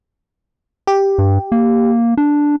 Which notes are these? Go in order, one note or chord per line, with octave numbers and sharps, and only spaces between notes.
G4
G2
A#3
D4